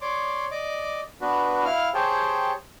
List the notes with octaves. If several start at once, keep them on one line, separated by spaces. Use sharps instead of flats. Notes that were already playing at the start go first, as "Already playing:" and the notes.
C#5 D5 C6 D6
D5 D#5 D6
B3 D4 F#4 B4
E4 F5 F6
G4 G#4 C5 C#5 G5 A5